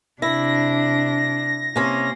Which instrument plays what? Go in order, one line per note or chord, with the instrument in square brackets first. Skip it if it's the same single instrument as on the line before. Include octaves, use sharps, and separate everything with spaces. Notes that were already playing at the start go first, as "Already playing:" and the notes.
[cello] C3 D4 [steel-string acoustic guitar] E4 [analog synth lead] A#6
[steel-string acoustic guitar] C3 C#4 [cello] A#3